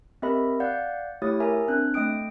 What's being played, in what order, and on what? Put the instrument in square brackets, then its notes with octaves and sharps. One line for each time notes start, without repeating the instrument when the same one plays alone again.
[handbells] C4 G4 A#4 D#5 E5 B5
D5 F5 F#5 G6
A3 E4 G4 C#5 D#6 A6
A#4 E5 G#5 A#5
C4 D4 F#6
A3 D#5 G5 D#6 D7